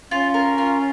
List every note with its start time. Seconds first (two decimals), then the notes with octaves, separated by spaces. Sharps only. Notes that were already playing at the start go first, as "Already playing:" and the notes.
0.11 C#4 F4
0.34 A#4
0.58 F4